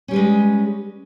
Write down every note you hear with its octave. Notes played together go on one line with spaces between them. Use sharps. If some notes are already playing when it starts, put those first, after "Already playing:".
G3 G#3 C#4 G#4 B4